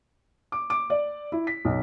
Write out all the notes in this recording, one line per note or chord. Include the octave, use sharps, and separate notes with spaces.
D6
D6
D5
E4
B6
B1